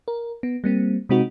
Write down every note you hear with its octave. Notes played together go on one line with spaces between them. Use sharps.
A#4
B3
G3 A#3 C4
C3 G#3 C4 D#4 F#4